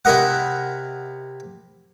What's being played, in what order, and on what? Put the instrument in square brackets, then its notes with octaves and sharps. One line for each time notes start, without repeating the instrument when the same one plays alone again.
[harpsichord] C3 E4 A#4 D#5 F#5